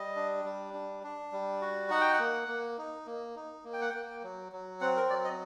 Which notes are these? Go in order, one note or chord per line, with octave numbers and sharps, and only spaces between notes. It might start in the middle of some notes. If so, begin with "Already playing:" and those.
Already playing: G3 D#5
D4
G3
D4
D4
G3
F#4
D#4 F#5
G5
F#5
A#3
A#3
D#4
A#3
D#4
A#3
G5
F#5
A#3 G5
F#3
F#3
C4 F#5
A#4
F#3 D5
D#5